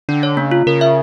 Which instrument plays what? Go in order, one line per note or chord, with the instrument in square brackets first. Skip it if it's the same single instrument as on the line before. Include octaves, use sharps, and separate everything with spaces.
[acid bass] D3 [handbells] D4
[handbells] C#5
[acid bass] C#3 [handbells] A#3
[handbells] F4
[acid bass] C#3 [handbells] A#4
[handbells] E5